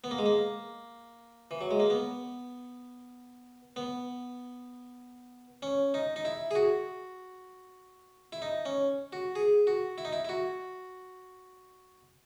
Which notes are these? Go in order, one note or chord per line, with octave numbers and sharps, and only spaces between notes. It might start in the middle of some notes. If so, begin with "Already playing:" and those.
B3
A#3
G#3
A#3
E3
F#3
G#3
A#3
B3
B3
C#4
D#4
D#4
E4
G#4
F#4
E4
D#4
C#4
F#4
G#4
F#4
E4
D#4
E4
E4
F#4